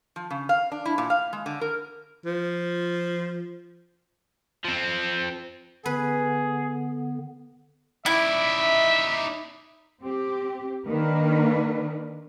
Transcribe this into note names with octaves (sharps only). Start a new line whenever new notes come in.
F3
C#3
F5
D4
E4
A#2
F5
G#3
D3
A#4
F3
F3 C4
D3 B3 G#4 B4
D#4 E4 D5 E5
C4 G4
D#3 A#3 D4 A#4 B4